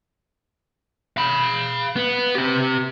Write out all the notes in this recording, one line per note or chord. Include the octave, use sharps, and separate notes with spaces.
F5 B5
B3
C4 G4